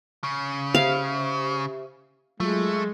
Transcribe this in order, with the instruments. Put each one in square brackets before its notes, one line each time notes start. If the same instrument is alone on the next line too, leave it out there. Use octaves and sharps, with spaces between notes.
[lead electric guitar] C#3
[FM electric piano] G4 C5 E5 [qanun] F5
[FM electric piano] F#3 F4 [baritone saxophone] G#3 [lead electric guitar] A3